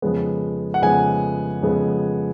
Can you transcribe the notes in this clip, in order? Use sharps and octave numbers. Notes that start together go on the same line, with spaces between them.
F2 C#3 G#3 B3
F#5
F2 C#3 G#3 B3 G#5
F2 C#3 G#3 B3